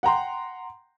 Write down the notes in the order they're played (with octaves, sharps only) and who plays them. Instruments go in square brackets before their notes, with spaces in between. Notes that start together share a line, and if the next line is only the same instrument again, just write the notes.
[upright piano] F#5 G5 A#5 C6